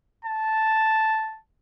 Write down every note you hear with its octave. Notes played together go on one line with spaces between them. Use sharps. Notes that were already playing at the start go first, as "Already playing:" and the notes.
A5